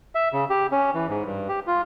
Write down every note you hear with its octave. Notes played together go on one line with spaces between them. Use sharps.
E5
C#3
G4
C#4
E3
G#2
G2
G4
F4